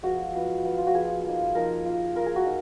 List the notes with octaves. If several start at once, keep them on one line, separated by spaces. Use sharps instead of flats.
F3 G#3 B3 F4 F#4
F3 G#3 B3 F4
F3 B3 F4
F4
F#4
F3 B3 F4 G#4
F3 A#3 D#4
F3 A#3 D#4 A#4
A#3 F4
A#3 F4 A#4
G#4
F#4
D#4